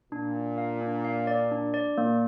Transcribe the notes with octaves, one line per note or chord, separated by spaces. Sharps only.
A#2 D4
D4
F5
D4
F5
D5
D4
D5
A#2 A#3